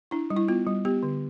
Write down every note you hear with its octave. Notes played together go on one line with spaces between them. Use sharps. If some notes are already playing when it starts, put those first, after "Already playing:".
D4 E4
G3
E4
B3 F4
G3
B3 G4
D3